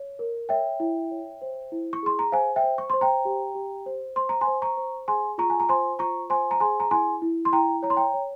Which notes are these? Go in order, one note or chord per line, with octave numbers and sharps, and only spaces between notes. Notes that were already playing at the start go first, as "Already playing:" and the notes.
Already playing: C#5
A#4
C#5 E5 G5
E4
C#5
C5
E4
C#6
G#4 C6
A#5
C5 F5 G#5
E5 G5
C5
C#6
C5 C6
G5 A#5
G4
G4
C5
C5 C6
A#5
G#5 C6
C5
A#5 C#6
C5
G#4 G#5 C6
F4 A#5 C#6
G#5
A#5
C5 G#5 C6
F4 A#5 C#6
C5 G#5 C6
A#5
G#4 G#5 C6
A#5
E4 G#5 C6
E4
C6
E4 G5 A#5
C#5 A#5
C6
G5 A#5
C#5